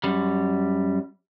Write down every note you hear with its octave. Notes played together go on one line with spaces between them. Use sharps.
F#2 G3